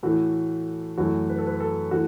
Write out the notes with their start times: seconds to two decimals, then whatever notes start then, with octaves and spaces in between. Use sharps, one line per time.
0.03 A2 E3 A3 F#4
0.98 F#2 E3 A3 F#4
1.29 B4
1.38 A4
1.47 B4
1.60 A4
1.91 E3 A3 F#4